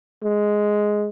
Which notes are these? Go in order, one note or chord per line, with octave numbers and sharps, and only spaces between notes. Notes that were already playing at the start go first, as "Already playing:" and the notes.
G#3